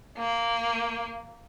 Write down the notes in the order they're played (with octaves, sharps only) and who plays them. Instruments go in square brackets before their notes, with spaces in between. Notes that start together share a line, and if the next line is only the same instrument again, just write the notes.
[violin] A#3